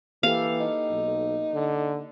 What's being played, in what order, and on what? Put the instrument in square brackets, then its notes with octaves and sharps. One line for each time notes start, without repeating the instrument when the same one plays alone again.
[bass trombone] E3 [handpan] A#3 G4 A4 [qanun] F5
[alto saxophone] D#4
[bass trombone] B1
D3